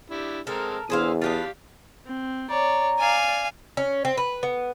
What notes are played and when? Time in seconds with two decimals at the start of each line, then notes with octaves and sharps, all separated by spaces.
0.10 D4 E4 G4
0.47 G#3 C4 A4 A#4
0.90 E2 D3 E4 G#4 C5 F5
1.22 B3 D4 F4 G4 F5
2.06 C4
2.50 C#5 D5 A#5
2.99 D5 F5 G#5
3.77 C#4
4.05 C4
4.17 B4
4.43 B3